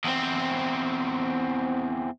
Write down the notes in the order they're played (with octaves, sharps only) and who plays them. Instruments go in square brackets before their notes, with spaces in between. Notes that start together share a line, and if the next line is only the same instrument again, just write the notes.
[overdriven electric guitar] E2 C4